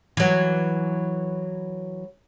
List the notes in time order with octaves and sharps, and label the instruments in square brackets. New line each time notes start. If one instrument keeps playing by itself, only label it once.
[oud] E3 F#3